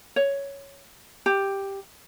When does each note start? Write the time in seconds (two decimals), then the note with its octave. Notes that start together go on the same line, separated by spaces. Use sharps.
0.16 C#5
1.26 G4